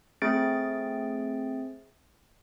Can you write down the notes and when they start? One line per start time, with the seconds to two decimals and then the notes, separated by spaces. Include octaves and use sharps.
0.22 A3 C4 G#4 A6 D7